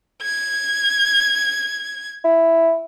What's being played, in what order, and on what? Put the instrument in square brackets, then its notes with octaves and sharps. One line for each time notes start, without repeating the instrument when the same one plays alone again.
[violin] G#6
[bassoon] E4